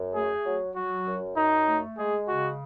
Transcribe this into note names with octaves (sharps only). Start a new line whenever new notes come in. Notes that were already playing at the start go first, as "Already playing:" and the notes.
Already playing: F#2
A3 G#4
F#3
F#3 F#4
F#2
F#2 D#4
A3
G#3 G#4
C#3 F#4